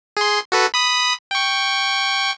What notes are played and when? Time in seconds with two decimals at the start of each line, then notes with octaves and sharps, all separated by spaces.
0.17 G#4 C6
0.52 F#4 A4 B4
0.74 B5 D#6
1.31 G5 C#6